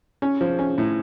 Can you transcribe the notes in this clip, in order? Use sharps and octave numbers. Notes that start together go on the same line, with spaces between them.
C#4
F3
C#4
A2